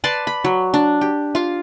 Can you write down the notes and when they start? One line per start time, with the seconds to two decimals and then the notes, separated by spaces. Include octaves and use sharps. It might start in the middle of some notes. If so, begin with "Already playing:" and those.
0.04 B4 D5 A5 C6
0.27 B5
0.44 F#3
0.74 D4
1.01 G4
1.35 F4 F5